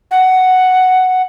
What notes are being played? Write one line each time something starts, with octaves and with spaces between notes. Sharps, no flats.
F#5